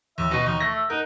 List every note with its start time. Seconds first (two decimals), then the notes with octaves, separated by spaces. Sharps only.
0.18 D#2 E5
0.31 B2 D#5 C#6
0.46 D#2 D#4 C#6
0.60 A3 A#6
0.75 E5
0.90 D#4 A#4 F#5